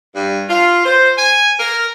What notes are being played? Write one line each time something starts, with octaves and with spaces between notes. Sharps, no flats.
G2
F4
C5
G#5
A#4